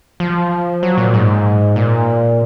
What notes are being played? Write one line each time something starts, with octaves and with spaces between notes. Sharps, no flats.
F3
F#3
A#2
G#2
A#2